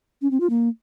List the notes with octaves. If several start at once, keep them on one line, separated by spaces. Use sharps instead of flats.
C#4
C4
F4
A#3